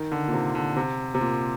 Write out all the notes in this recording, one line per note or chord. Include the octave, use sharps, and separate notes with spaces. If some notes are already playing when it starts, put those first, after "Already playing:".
Already playing: D#3
D3
A#2
C3
D3
C3
C3
A#2